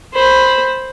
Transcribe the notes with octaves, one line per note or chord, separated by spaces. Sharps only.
C5 B5